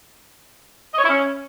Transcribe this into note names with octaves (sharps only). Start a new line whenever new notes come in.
D#5
C#5
E4
C#4